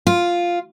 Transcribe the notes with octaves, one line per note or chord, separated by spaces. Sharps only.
F4